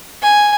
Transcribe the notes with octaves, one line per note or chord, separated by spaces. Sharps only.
G#5